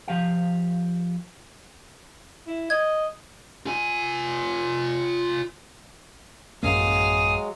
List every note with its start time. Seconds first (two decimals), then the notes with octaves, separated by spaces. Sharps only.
0.08 F3 G4 F5
2.47 E4
2.70 D#5 G#6
3.66 F4 G#5
6.63 A1 F#2 F#3 G#3 A#3 F5 G#5 D#6